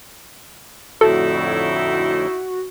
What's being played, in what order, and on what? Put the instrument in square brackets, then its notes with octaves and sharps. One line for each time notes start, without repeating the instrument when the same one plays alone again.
[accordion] F2 A2 D3 [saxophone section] D#4 E4 [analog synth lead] F#4 [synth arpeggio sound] A4